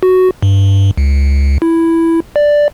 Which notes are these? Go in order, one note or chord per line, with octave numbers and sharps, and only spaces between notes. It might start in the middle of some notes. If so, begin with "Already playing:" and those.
F#4
G2
C#2
E4
D5